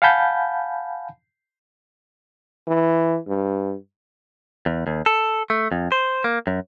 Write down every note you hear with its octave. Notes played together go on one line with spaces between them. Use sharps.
F5 F#5 G#5 A5 B5 G6
E3
G2
E2
D#2
A4
A3
F2
C5
A#3
F#2